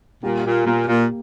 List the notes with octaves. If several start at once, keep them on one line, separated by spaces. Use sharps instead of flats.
A#2 G3
A#2
A#2 A#3
A#2